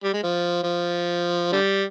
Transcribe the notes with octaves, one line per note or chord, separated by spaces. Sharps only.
G3
G#3
F3
F3
D3 G3